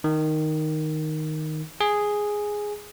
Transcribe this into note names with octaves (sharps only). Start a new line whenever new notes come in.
D#3
G#4